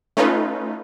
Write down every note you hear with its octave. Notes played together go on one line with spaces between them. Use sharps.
A3 C#4 D#4 F4 B4